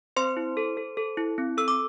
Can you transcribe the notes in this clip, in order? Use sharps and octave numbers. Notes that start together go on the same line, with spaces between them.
C4 C5 C6
E4
A4
A4
A4
E4
C4
A4 E6
D6